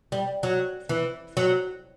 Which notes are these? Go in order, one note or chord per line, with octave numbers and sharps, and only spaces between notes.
G3
F#3
E3
F#3